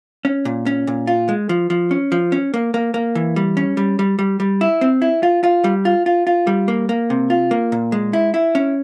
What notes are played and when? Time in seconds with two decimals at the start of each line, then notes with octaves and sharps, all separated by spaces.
0.25 C#4
0.45 A#2
0.66 C#4
0.87 A#2
1.07 F4
1.29 G#3
1.49 F3
1.70 F3
1.91 C#4
2.12 F3
2.32 C#4
2.54 A#3
2.74 A#3
2.94 A#3
3.15 E3
3.36 G3
3.57 C#4
3.77 G3
3.99 G3
4.19 G3
4.40 G3
4.61 E4
4.81 C4
5.02 E4
5.23 F4
5.44 F4
5.64 G3
5.85 F4
6.06 F4
6.27 F4
6.47 G3
6.68 A#3
6.89 A#3
7.10 C3
7.30 F4
7.51 A#3
7.72 A#2
7.92 G#3
8.13 E4
8.34 E4
8.55 C#4